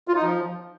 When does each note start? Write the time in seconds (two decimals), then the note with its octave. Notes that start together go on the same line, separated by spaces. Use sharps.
0.08 F4
0.15 D#4
0.22 F3